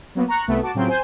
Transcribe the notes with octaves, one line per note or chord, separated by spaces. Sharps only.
F#3 A#3 B3
A#5 C#6 F#6
C2 A3 B3
F#4 A5 D6
A2 C#3 F#3 C4 F4 G5
C5 G#5 G6